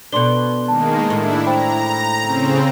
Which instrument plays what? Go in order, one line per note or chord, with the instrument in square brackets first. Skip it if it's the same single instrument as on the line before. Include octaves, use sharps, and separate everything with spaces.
[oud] B2 D4 [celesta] A4 C6 G7
[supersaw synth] D#3 G#3 A#3 [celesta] A5
[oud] A2 [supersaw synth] D4 E4
[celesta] C5 G5 B5 [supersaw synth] A#5
[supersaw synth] C#3 C4